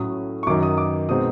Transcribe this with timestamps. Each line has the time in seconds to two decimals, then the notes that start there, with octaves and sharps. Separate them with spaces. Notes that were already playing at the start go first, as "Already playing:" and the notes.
Already playing: A2 F#3 A3 C#4 D#6
0.43 C#6
0.47 F#2 D#3 F#3 D6
0.63 D#6
0.78 D6
1.09 B2 G#3 C4 D#4 D#6